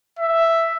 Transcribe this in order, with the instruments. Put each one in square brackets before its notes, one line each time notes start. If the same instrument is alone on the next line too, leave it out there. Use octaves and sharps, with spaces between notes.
[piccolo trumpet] E5